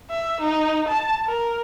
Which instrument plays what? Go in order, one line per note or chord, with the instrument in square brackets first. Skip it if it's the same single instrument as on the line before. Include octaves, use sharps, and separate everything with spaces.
[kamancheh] E5
D#4
A5
A#4